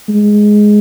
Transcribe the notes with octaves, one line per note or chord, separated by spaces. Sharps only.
G#3